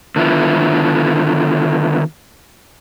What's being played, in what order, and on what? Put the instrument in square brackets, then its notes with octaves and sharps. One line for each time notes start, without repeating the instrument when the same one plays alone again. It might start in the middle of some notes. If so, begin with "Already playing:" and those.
[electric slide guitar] D3 D#3 B3 E4 F4